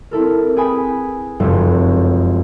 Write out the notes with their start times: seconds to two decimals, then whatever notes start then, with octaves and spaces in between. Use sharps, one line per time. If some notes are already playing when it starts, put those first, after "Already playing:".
0.11 C4 E4 A4 A#4
0.57 G#4 B4 G5 G#5 B5 D#6
1.40 F1 C#2 F#2 A4 C5